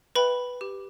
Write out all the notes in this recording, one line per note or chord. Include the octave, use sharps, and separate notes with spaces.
B4 E5 G5 B5
G4